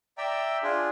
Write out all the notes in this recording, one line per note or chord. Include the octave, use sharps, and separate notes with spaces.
D5 E5 G5 A#5 E6
D4 F4 G#4